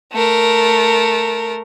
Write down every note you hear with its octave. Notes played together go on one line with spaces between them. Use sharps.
A3 A#4